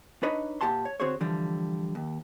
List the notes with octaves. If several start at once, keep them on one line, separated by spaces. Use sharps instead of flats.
D4 D#4 B4 C#5 D#5
A#2 G4 F#5 A5 C6
C#5
D3 C4 F#4 G#4 C5 C#5
D3 E3 F3 G3
D#2